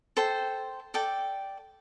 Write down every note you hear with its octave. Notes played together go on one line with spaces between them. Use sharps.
A4 C5 G5 C6
A4 D5 G5